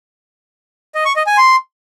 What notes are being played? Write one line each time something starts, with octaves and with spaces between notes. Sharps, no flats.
D#5
C#6
D#5
G#5
C6